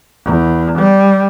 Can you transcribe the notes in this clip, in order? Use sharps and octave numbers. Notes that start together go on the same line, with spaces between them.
E2
G3